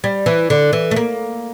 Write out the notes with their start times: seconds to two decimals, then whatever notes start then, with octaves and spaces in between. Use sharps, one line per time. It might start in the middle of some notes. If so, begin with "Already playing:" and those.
0.04 G3
0.26 E3
0.50 D3
0.73 E3
0.91 A3
0.96 A#3